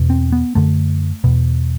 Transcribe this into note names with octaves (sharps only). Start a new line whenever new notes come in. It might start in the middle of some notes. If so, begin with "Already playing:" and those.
Already playing: E2 B2
C4
B3
F#2 D3 A3
E2 B2